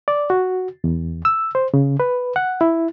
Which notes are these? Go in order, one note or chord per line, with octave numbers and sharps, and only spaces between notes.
D5
F#4
E2
E6
C5
C#3
B4
F#5
E4